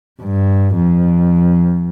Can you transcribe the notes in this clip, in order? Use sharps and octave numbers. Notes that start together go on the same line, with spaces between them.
G2
F2